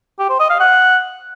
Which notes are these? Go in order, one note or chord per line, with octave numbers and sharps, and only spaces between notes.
G4
C5
D#5
F5
F#5